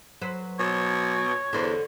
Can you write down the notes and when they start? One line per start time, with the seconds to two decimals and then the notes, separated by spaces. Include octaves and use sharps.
0.22 F#3 B4 C5
0.59 B2 C#5
1.53 E2 D3 C5